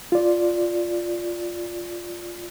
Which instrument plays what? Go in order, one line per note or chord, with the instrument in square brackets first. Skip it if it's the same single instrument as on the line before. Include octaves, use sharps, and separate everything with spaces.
[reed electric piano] F4 D5